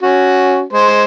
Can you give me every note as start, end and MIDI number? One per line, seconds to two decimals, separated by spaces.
0.03 0.62 61
0.03 0.62 66
0.73 1.05 56
0.73 1.05 72